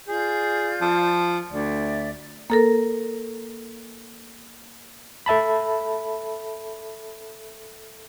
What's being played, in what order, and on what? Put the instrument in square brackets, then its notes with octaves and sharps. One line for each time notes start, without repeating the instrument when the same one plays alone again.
[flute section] F4 D5 G6 [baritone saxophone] G#4
[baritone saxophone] F3
[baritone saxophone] D2 [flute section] D5 E5
[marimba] A#3 A4 A#4
[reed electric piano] A4 E5 A5 B5